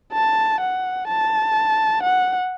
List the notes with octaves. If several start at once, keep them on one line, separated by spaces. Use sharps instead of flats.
A5
F#5
A5
F#5